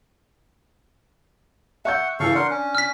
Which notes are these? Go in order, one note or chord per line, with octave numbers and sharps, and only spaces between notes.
E5 F#5 C#6 G6
C#3 E3 A4 F5 C#6
D4 A#4 F#5 C6
C#4
F6 B6